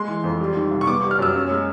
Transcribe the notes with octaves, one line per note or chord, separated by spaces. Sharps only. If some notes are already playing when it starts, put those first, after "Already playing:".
Already playing: G#3 C6
E3
F2
G3
D#3
C2
C#6
B3 D6
G3
F6
F#2 E6
C#4
G#3